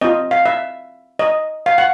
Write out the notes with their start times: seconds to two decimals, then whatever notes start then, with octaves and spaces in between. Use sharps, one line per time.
0.01 C4 F4 D#5
0.31 F5
0.46 E5
1.19 D#5
1.66 F5
1.78 F#5